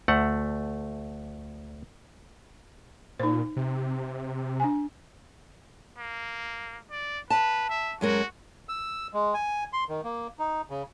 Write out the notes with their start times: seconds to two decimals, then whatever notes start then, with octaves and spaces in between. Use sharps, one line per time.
0.08 D2 A3 F#5
3.20 A#2 D#4 C5
3.56 C3
4.60 D4 G#5
5.98 A#3
6.91 D5
7.30 B4 A5
7.70 E5
8.01 F#2 G#3 F#4 A#4
8.69 E6
9.14 G#3
9.34 G#5
9.73 C6
9.89 D#3
10.04 A#3
10.39 D#4
10.70 C#3